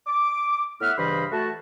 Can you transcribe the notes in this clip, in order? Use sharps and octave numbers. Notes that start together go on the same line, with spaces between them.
D6
A2 B3 E5 F#5 F6
G2 C#3 E3 C5 D#5 B5
A3 F#4 A5